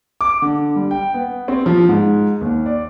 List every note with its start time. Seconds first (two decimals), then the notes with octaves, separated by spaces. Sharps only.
0.21 D6
0.42 D3
0.76 G3
0.91 G5
1.14 B3
1.48 C4
1.66 F3
1.89 G#2
2.41 D#2
2.66 D5